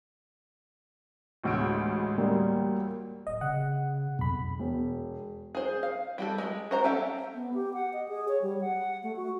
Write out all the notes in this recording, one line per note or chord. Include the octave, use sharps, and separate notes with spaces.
A1 D2 G#3 D7
G3 A#3
D1 D#5
C#3 F#5
B1 F2 B5
E1
G#4 C5
F5
G3 G4 A4
G#3
F#4 C5 A#5
C#4 G4 A4 E5 F#5
B3
G4
F#5
D#5
G#4
C#5
G3
F#5
A3
F#4